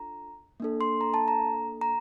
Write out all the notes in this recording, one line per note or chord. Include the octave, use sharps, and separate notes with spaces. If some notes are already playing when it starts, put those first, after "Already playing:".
Already playing: D4 F4 A4 A#5
A#3 D4 A4
C6
A#5
A5
A#5
A#5